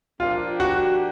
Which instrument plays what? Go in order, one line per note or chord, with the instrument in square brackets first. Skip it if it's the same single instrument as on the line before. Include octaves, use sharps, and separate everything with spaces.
[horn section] F3 A#3 D4 G4 [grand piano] F4
[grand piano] F#4